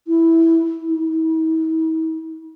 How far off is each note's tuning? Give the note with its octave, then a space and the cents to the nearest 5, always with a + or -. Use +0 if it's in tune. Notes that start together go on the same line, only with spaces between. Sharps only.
E4 -5
E4 -45